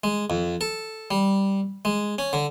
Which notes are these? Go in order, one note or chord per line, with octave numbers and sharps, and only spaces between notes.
G#3
F2
A4
G3
G#3
C#4
D3